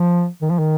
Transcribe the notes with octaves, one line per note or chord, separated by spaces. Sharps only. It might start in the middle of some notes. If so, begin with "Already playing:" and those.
Already playing: F3
D#3
F3
D#3